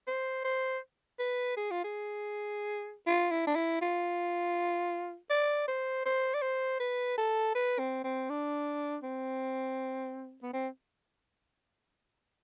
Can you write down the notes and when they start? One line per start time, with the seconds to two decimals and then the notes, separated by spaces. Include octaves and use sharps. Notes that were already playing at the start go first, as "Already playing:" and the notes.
0.08 C5
0.45 C5
1.19 B4
1.57 G#4
1.71 F4
1.84 G#4
3.07 F4
3.31 E4
3.47 D4
3.56 E4
3.82 F4
5.30 D5
5.68 C5
6.06 C5
6.34 D5
6.42 C5
6.80 B4
7.18 A4
7.55 B4
7.79 C4
8.04 C4
8.30 D4
9.03 C4
10.43 B3
10.53 C4